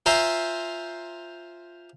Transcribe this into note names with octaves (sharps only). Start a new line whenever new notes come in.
F4 C5 E5 G#5 A#5 C6